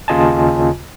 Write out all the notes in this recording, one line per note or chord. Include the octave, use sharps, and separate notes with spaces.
D#2 C#3 F4 D#5 G#5 A5